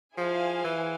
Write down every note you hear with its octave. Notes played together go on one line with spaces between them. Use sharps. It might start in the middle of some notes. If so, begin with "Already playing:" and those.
F3 E4 G#4 C5 F5 G#5
E3